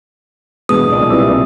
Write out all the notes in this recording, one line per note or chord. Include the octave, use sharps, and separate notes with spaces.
E2 G2 B2 G#3 B3 D#6
B1 A#2 C#3 D5
C2 B4 D5 E5